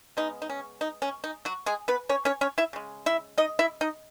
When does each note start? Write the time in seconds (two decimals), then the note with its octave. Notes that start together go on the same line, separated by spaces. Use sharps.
0.17 C#3 G#3 B3 D#4
0.42 D#4
0.50 C#4
0.81 D#4
1.02 C#4
1.24 D#4
1.45 F#3 F#4
1.66 G#3 G#4
1.88 B3 B4
2.09 C#4 C#5
2.25 C#4 C#5
2.41 C#4 C#5
2.58 E4 E5
2.73 C#3 G#3
3.06 E4 E5
3.38 D#4 D#5
3.59 E4 E5
3.81 D#4 D#5